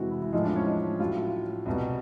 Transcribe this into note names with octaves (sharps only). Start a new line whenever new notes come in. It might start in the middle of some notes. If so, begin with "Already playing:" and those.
Already playing: F2 C3 E3 G#3 E4 F#4
E4
E4
A2 F3 G#3 D#4
D4
C#4
D#4
A2 F#3 F4
C2 B2 G3